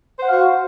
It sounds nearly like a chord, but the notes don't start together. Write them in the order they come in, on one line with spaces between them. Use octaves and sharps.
C5 F#5 F5 F#4